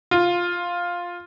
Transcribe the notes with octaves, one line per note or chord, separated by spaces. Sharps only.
F4